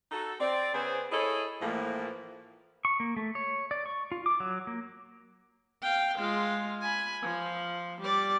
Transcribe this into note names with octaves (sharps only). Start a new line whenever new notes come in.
D#4 F#4 A4
C4 D5
C#3 B3 G#4 C5
E4 G#4 A4 C#5 D#5
A2 E3 F3 A3 A#3
C#6
A#3
A3
C#5
D5
C#6
F4
D6
F#3
A#3
F5 G5
G#3 F4
G#5 B5
F3
G3 D5